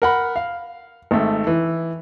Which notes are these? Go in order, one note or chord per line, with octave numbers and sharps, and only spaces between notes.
A#4 F#5 B5
F5
G#1 A3
E3